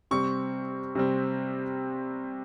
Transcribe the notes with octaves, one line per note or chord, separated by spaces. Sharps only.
C3 G3 C4 C#6
C3 G3 C4